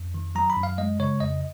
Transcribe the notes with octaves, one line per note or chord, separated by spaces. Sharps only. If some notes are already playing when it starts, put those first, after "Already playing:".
Already playing: F2
D#3
F#3 A#5
B5
F#2
F5
G#3 D#5
C#3 C#5
F2 D#5